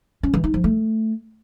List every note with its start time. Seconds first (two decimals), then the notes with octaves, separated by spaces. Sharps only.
0.23 C#4
0.34 E3
0.44 D#4
0.54 F3
0.64 A3